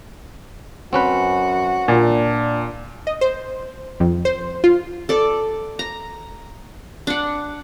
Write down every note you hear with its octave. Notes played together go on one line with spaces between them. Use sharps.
F#2 C4 C#4 F#4 B4
A#2 D4
D#5
C5
F2
C5
F4
A4 D5
A#5
D4 F#5